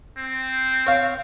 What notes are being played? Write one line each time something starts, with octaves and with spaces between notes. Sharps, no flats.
C4
C#5 F5